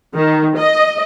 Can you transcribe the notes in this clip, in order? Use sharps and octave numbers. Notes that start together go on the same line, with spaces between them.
D#3
D#5